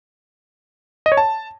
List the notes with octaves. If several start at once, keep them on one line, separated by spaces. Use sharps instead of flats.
D#5
C#5
A5